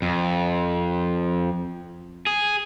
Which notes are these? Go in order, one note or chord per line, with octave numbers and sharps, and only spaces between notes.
F2
G#4